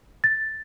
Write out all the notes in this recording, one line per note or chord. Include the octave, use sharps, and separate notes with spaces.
A6